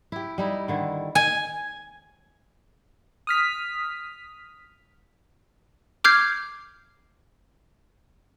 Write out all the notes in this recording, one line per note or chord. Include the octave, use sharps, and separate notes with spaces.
E4 G4
G3 D#4 E4
D3 D#3 E4
G#5
D#6 F6 B6
D6 F6 G6 G#6 C7